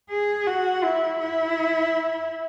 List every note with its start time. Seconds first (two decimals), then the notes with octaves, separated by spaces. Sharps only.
0.10 G#4
0.47 F#4
0.83 E4
1.20 E4